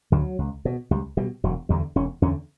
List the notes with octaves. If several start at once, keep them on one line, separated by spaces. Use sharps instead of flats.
D2 D3 F#3
C#2
B2
C#2 G3
B2 G3
E1 F#3
E2 D3 G3
E1 C#4
E2 D3 C#4